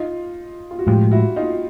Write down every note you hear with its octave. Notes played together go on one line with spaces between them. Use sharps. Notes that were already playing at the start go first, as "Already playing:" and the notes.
Already playing: D#4 F4
F4
F#4
A2 F3 G#3 F4 G4
E4 F#4
D#4 F4